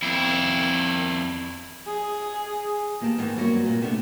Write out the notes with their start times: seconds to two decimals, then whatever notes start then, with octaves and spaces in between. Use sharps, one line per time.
0.02 F2 E4
1.87 G#4
3.01 D#3 A#3 B3 G4 A5
3.18 G#2 D#3 E3 A#3 B3
3.37 G2 F#3 A#3 C4 F#4
3.66 A#2
3.82 C3 A3 B3 D4